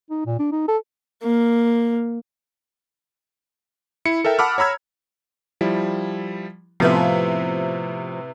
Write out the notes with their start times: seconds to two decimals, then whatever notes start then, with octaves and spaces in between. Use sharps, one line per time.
0.10 D#4
0.26 A#2
0.39 D4
0.52 D#4
0.68 A4
1.23 A#3
4.05 E4 C#7
4.25 A4 A#4 E5 G5
4.39 F#5 A5 B5 D6 E6 F6
4.58 C#5 A#5 B5 E6 G#6
5.61 F3 G3 E4
6.80 A2 C3 F3 B3 E4